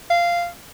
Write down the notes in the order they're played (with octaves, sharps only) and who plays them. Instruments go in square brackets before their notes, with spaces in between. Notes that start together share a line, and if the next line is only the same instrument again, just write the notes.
[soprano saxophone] F5